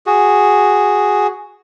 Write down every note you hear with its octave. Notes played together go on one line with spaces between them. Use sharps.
F#4 G#4